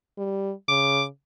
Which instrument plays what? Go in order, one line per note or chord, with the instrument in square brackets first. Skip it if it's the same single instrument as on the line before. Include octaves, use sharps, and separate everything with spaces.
[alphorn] G3
[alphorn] C#3 [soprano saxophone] D6